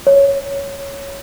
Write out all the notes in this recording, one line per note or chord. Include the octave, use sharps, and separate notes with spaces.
C#5